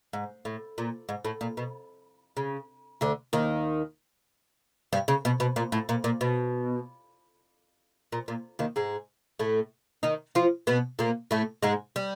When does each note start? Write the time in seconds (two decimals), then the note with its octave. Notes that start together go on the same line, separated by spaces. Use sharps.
0.13 G#2
0.45 A2
0.78 A#2
1.09 G#2
1.25 A2
1.41 A#2
1.57 B2
2.37 C#3
3.01 D2 D3
3.33 D#2 D#3
4.93 G2 G3
5.08 C#3
5.25 B2
5.40 B2
5.56 A#2
5.72 A2
5.89 A#2
6.04 A#2
6.21 B2
8.12 A#2
8.28 A#2
8.59 D#2 D#3
8.76 G#2 G#3
9.39 A2 A3
10.03 D#3 D#4
10.35 F3 F4
10.67 B2 B3
10.99 A#2 A#3
11.31 A2 A3
11.63 G#2 G#3
11.96 G3